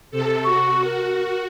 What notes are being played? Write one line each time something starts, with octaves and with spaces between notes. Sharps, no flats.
C3 A4
F#4 C#6
A#4